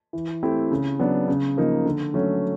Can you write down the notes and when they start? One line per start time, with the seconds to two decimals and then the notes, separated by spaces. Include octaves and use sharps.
0.13 E3
0.43 A3 C4 E4 G4
0.71 C#3
0.99 F#3 B3 D4
1.28 C#3
1.57 F3 A#3 D#4
1.85 D3
2.14 F#3 A3 C#4